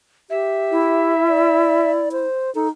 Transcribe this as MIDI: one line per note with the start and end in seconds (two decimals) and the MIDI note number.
0.30 1.13 67
0.30 1.91 76
0.71 2.25 64
1.28 2.09 74
2.12 2.53 72
2.55 2.69 63
2.55 2.67 69